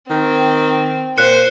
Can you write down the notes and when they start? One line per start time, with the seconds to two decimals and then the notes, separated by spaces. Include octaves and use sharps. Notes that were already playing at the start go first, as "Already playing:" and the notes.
0.10 D#3 C4
1.18 A#2 C5 F#6 C#7